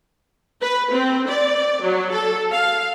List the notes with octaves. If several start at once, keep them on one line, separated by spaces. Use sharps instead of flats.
B4
C4
D5
F#3
A4
F5